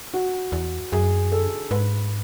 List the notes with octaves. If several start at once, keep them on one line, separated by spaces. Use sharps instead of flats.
F#4
E2
F#2 G#4
A4
G#2 B4